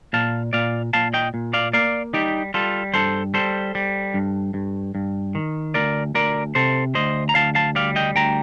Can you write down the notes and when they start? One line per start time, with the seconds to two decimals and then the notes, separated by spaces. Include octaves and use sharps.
0.13 A#2 F5 A5
0.53 A#2 D5 F5
0.93 A#2 F5 A5
1.14 D#5 G5
1.34 A#2
1.53 D5 F5
1.73 A#3 D5 F5
2.14 G3 D#4 G4
2.54 G3 F4 A4
2.94 G2 A4 C5
3.34 G3 A4 C5
3.75 G3
4.14 G2
4.54 G2
4.95 G2
5.35 D#3
5.74 D2 A#4 D5
6.15 D2 A#4 D5
6.55 C3 A4 C5
6.95 D2 C5 D#5
7.29 A#5
7.35 D2 F5 A5
7.55 F5 A5
7.75 G3 D5 F5
7.96 D#5 G5
8.15 D2 G5 A#5